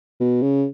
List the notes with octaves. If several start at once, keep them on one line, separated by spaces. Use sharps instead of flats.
B2
C#3